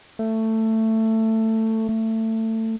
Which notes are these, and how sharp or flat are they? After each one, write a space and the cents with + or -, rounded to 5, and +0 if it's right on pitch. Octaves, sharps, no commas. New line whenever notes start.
A3 +15
A3 +20